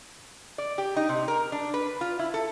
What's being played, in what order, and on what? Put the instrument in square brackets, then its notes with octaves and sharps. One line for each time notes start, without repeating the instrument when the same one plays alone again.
[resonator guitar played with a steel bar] D5
G4
D#4
C3
A#4
D4
B4
F4
E4
A4